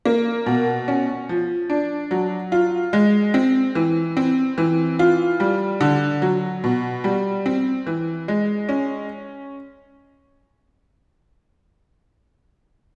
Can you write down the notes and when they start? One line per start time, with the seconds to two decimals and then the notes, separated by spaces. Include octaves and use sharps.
0.06 A#3
0.46 B2
0.88 C#4
1.29 F3
1.70 D4
2.11 F#3
2.52 F4
2.93 G#3
3.34 C4
3.75 E3
4.17 C4
4.58 E3
4.99 F4
5.40 G3
5.81 D3
6.22 F#3
6.64 B2
7.04 G3
7.46 C4
7.87 E3
8.28 G#3
8.69 C#4